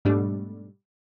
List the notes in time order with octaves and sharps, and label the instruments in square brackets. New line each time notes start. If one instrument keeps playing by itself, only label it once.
[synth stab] G#2 B2 G3 A3 D4